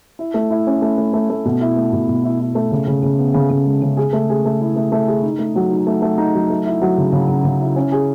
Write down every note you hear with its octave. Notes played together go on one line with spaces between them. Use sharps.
E4
A3
E4
C#4
A3
A3
A3
A3
B2
E4
A3
B2
B2
E4
E4
A3
C#3
C#3
C#3
B3
C#3
C#3
G#3
C#3
G#4
A3
G#4
A3
E4
A3
A3
G#4
D#4
A3
F#3
D#4
A3
A3
D#4
F#3
A3
E4
F#3
C#3
C#3
C#3
C#3
E4
C#4
G#4